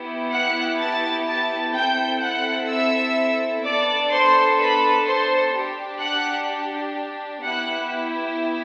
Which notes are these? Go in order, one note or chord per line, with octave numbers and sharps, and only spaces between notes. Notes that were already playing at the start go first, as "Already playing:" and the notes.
Already playing: B3 E4 G4
F#5 F#6
A5 A6
A5 A6
C4 E4 A4 G5 G6
F#5 F#6
E5 E6
B3 D4 A4 D5 D6
C5 C6
B4 B5
C5 C6
D4 G4
F#5 F#6
B3 E4 G4 F#5 F#6